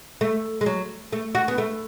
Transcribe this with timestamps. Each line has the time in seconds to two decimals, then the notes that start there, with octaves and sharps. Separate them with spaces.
0.21 A3
0.61 G#3
0.66 F#3
1.13 A3
1.35 F#4
1.48 B3
1.58 A3